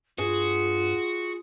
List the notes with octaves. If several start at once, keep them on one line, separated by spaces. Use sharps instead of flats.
G2 F4 F#4 G#4